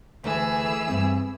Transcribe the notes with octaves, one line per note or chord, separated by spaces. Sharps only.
D2 E3 G#4 E6
G2 C4